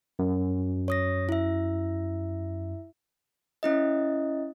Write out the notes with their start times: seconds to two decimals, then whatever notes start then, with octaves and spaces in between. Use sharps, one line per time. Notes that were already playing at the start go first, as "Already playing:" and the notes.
0.19 F#2
0.88 C#5 D#6 A#6
1.29 E4 E5
3.63 C#4 E4 D#5